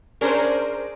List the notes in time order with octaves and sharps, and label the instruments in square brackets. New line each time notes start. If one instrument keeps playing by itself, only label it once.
[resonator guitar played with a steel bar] C#4 D4 G#4 [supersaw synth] A#4 C5